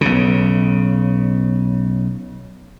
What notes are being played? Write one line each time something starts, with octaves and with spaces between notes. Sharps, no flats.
B1 C#3